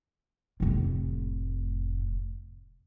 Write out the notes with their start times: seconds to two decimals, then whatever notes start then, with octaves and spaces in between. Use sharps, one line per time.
0.60 F1 A2